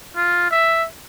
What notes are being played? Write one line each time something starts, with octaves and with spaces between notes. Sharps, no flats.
F4
E5